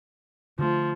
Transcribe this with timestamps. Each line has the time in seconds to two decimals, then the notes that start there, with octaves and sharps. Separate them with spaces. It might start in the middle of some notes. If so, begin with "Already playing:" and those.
0.59 D3 F3 A3